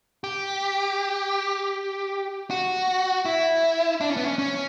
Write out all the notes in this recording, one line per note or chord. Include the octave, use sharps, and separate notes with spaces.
G4
F#4
E4
D4
C#4
B3
C#4
C#4